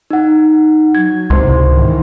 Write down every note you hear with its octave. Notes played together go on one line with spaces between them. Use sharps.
D#4 F#5
F#3 G#6
C#2 G#2 C3 E3 C5 C6
G#2 D#3 E3